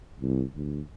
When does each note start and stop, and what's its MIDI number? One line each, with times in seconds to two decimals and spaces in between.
0.20 0.44 36
0.56 0.81 38